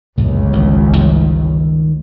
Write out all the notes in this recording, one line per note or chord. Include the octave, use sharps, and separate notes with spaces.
G1 C#2 F#2 A#2
A1 D#3
D#3 G3 A3